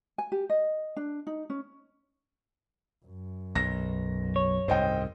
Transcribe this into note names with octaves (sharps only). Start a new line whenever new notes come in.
G#5
G4
D#5
D4
D#4
C#4
F#2
B1 A#6
C#5
C2 G#2 C5 D#5 G5